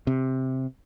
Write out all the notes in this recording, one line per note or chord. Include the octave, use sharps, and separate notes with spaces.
C3